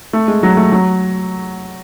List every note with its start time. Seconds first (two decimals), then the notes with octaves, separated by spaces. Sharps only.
0.13 A3
0.28 G#3
0.43 F#3
0.57 A3
0.72 F#3